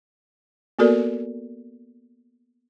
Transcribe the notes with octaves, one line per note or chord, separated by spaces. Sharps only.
A#3 B3 F#4 A4 A#4 D5